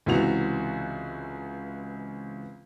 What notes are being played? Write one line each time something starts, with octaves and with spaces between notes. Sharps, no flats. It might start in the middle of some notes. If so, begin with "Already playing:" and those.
C#2 C3 E3 F#4 F7